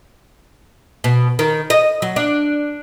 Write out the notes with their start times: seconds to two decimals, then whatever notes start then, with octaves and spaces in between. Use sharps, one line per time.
1.04 B2
1.39 D#3
1.70 D#5
2.02 F#3
2.16 D4